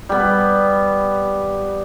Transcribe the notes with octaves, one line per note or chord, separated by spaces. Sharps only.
G3 B3